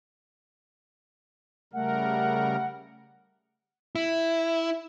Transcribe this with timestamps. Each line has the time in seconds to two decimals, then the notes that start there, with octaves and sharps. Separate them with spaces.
1.73 C#3 G3 A3 A#4 F#5
3.95 E4